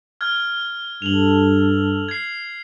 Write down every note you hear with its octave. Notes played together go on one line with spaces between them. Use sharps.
F6 G#6
G2 A4 F7 F#7
G#6 C7